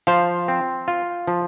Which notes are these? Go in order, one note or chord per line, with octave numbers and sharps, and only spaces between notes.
F3 C5 F5
C4
F4
F3